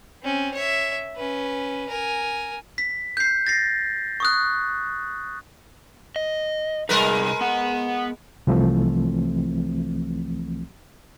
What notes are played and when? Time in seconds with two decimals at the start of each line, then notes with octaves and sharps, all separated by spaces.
0.23 C4 C#4
0.54 C#5 E5
1.16 C#4 B4
1.89 A#4 G#5
2.78 B6
3.17 G6 C7
3.47 A6 A#6 C7
4.20 C#6 D#6 F#6
6.16 D#5
6.89 C3 G3 G#3 D#4 A#4 B4
7.41 B3 F#5
8.47 C2 E3 F3 A3 C4